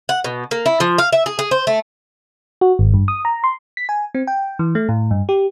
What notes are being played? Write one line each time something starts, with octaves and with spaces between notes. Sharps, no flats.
F#5
B2
A#3
E4
F3
F5
E5
G#4
G#4
C5
A3
F#4
G#1
G2
D#6
A#5
C6
B6
G#5
C4
G5
E3
A3
A2
G2
G4